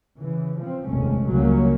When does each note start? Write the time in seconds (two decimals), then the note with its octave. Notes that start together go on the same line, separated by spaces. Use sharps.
0.19 C#3 E3
0.60 F3 C4
0.89 F1 A#1 D#2 G#3 A3 C#4
1.30 C#2 C#3 F#3 G3 A#3 C#4